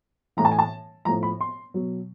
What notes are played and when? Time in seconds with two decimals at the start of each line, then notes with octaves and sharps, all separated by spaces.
0.37 A2 E3 A#5
0.45 A5
0.52 G#5
0.59 A5
1.05 A2 F3 A#5
1.23 B5
1.41 C6
1.74 B2 F#3